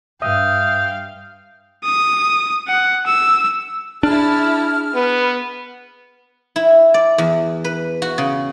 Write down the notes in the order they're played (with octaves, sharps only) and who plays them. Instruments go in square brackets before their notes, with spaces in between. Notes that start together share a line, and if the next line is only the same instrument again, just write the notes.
[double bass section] G2 [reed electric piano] E5 D#6 [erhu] F5 [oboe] G5
[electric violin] D#6
F#5
E6
[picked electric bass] D4 [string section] E4 A5 [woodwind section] G#4 F6
[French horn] B3 [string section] B4
[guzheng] E4
D5
E2
B4
F#4
C#3